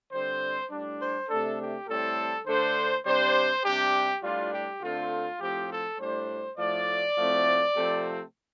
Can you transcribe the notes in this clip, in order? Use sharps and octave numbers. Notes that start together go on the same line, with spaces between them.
D3 G3 C4 C5
A2 G3 D4
C5
C3 A3 D4 A4
G4
A2 G3 C4 A4
D3 A3 D4 C5
C3 G3 D4 C5
C3 G3 D4 G4
A2 G3 D4 F4
G4
D3 A3 C4 F4
A2 F3 C4 G4
A4
A2 G3 D4 C5
A2 F3 A3 D5
A2 F3 A3 C4
C3 F3 A3 C4